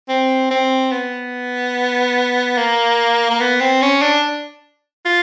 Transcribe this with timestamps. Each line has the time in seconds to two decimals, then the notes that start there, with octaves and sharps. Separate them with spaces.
0.09 C4
0.51 C4
0.92 B3
2.57 A#3
3.31 A#3
3.40 B3
3.61 C4
3.82 C#4
4.02 D4
5.06 F4